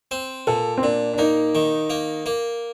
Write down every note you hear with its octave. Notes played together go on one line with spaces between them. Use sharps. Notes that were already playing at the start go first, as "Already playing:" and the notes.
C4
A#2 A4
C4
A#2 D4
D4
A#3 D#4
D#3
A#3
A#3